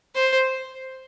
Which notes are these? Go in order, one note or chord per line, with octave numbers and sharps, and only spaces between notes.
C5